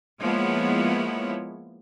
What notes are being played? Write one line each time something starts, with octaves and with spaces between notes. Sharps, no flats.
F3 G#3 A#3 B3 E4 C#5